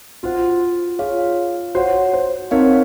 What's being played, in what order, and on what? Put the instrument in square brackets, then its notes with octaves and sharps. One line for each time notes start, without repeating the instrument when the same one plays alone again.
[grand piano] F4 [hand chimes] F#4 C5 F#5
[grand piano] F4 [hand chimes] G#4 C#5 F5
[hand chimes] F#4 C#5 F#5 [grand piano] C5
[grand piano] C5
[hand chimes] C4 D#4 A#4 F5 [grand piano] C#5